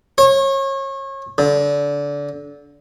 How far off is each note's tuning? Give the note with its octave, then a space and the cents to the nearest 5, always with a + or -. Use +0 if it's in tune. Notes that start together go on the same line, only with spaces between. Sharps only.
C#5 -30
D3 -25